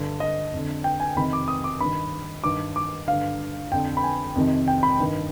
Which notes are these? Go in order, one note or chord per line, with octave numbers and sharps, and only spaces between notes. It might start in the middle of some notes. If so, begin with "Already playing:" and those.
Already playing: G2 D3
D#5
F2 D3
G5
G#5
F2 C3 D#3 B5
D6
D#6
D6
G2 D#3 B5
G2 D#3 D6
D6
G2 D3 F5
F2 D3 G5
B5
G#5
F2 C3 D#3
G5
B5
G2 D#3